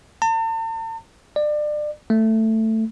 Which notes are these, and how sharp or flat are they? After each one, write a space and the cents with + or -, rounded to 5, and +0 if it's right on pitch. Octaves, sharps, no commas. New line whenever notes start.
A5 +45
D5 +30
A3 +10